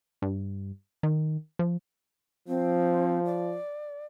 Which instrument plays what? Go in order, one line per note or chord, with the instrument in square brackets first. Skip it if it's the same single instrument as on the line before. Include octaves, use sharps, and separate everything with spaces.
[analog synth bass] G2
D#3
F3
[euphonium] F3 [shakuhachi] C4
[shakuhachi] D5